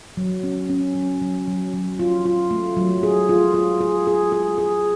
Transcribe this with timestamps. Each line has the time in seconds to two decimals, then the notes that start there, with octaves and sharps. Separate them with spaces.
0.17 F#3
0.44 C#4
0.70 C#4
0.95 F#3
1.22 F#3
1.47 F#3
1.73 F#3
1.99 F4
2.26 F4
2.51 A3
2.77 F#3
3.03 G#4
3.29 F4
3.54 F4
3.81 G#4
4.07 G#4
4.32 G#4
4.58 G#4